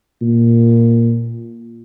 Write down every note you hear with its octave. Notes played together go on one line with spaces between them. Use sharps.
A#2